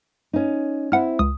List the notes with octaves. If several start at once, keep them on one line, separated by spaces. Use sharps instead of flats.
C#4 D#4
C4 E4 F#5 F6
C#2 D#6